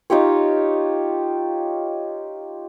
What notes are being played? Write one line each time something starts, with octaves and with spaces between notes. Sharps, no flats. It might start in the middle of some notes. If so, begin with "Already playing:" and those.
D#4 F4 G4 C#5